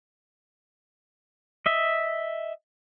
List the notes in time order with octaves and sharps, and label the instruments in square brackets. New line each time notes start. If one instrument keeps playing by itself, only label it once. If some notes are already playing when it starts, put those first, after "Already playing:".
[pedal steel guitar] D#5 E5